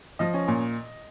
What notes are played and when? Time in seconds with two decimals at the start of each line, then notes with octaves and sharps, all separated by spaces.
0.19 F3 D#5
0.34 C#4
0.48 A#2